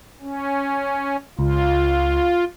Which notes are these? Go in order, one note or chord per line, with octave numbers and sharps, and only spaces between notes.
C#4
C#2 F4